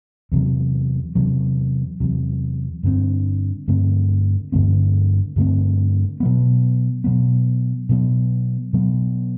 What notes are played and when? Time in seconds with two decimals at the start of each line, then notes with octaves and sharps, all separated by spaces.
0.32 E2 C3 F#3
1.15 E2 C3 F#3
2.00 E2 C3 F#3
2.83 G2 D3 A3 C4
3.68 G2 D3 A3 C4
4.52 G2 D3 A3 C4
5.36 G2 D3 A3 C4
6.20 B2 F#3 B3
7.04 B2 F#3 B3
7.89 B2 F#3 B3
8.73 B2 F#3 B3